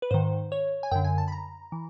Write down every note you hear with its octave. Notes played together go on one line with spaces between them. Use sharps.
B4
G#2 D#3 C5
C#5
G#5
F#2 D3 G5
G#5
A5
B5
A#5
E3